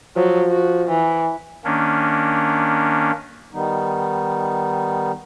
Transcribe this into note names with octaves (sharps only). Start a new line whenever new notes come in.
F3 F#3
F#4
E3
D#3 A#3 C#4 D4
D#3 G3 B3 D#4